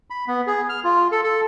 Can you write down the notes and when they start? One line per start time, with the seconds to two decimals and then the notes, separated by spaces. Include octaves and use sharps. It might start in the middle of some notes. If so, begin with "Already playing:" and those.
0.10 B5
0.27 B3
0.47 G#4
0.69 F6
0.84 F4
1.12 A4
1.23 A4